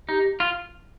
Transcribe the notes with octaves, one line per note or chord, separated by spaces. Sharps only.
D#4 G4
F4